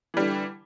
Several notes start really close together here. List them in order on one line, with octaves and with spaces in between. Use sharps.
E3 G3 D3